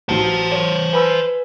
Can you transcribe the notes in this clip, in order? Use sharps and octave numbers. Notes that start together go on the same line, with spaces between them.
A1 F#3 C5 A5
C#5
B4 G#5 B5 E6